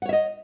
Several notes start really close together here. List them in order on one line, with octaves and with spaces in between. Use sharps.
F#5 C#5 E5 D#5